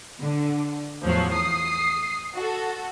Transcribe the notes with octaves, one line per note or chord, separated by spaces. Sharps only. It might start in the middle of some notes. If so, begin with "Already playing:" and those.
D3
E2 A2 F3 F#3
D#6 C7
F#4 A4